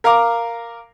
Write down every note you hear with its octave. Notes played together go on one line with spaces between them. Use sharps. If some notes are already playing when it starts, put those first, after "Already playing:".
A#4 F5 A#5 D6